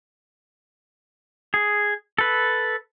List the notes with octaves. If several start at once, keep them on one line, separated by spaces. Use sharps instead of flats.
G#4
A4 B4